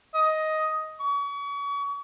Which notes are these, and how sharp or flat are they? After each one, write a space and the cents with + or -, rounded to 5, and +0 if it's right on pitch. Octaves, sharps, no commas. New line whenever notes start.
D#5 +10
C#6 +35